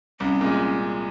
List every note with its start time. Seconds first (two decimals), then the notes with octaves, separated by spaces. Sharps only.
0.20 C2 C#4
0.41 A#2 G#3